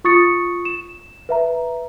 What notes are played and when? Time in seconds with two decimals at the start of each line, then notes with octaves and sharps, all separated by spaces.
0.04 F4 C#6 D#6 A6 C#7
0.65 E7
1.29 B4 E5 A#5